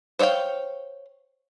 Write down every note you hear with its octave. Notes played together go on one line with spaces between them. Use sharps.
C5 C#5 E5 F5 G5